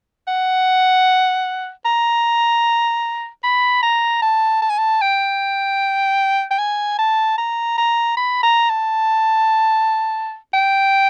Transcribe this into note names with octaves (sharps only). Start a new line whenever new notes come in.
F#5
A#5
B5
A#5
A5
A5
G#5
A5
G5
G5
G#5
A5
A#5
A#5
B5
A#5
A5
G5